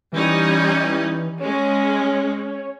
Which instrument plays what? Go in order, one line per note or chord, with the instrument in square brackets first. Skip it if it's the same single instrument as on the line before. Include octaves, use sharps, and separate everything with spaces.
[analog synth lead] E3 [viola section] G3 C#4 D#4
[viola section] G#3 [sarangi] C#4 [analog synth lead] C#5